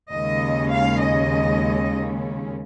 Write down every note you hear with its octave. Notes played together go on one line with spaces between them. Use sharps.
D#2 C#3 G#3 C#4 D#5
F5
D#5